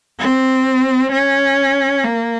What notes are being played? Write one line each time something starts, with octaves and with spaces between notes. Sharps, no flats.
C4
C#4
A#3